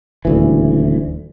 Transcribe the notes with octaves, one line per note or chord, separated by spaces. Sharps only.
D#1 D2 E3